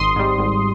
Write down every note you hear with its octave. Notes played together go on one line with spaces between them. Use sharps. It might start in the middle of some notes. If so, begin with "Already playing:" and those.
Already playing: G#1 C6 D#6
G#2 G3
G#1